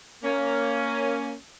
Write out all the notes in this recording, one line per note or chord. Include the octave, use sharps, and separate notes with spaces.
A#3 C#4